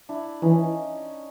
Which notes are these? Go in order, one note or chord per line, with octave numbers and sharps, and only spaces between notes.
D4 E4
E3 C#4 D#4